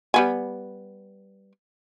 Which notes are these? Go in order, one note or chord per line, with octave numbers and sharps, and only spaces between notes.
G3 B3 G#5